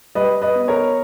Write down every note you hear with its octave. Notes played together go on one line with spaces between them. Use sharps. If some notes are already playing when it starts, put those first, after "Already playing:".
G3 B4 D#5
B4 D#5
B3
A#4 C#5